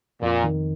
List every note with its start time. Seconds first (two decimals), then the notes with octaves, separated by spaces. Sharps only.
0.22 F2 A#2
0.44 D#3